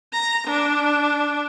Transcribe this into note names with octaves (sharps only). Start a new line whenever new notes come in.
A#5
D4